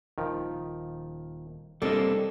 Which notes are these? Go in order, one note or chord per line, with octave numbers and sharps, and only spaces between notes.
D#1 D#3 F3
E1 G3 A#3 C4 D4 A4 D5 D#5